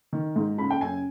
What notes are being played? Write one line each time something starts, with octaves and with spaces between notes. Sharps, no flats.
D#3
G#2
C#3 B5
G5
F#2 G#5